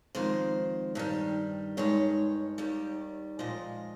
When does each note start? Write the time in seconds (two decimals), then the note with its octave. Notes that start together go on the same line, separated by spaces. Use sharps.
0.15 F2 D#3 G#3 C5
0.95 G2 D#3 G3
1.77 G2 D#3 G#3 C#5
2.58 D#2 D#3 G3
3.39 A#2 F3 G#3 D#5